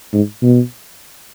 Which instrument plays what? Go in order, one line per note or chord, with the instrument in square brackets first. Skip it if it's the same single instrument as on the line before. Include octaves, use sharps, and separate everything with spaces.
[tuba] G#2
B2